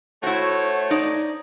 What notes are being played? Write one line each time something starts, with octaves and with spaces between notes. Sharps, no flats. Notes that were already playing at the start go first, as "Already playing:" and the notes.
A3 E4 F#4 C5 C#5
D#4 D5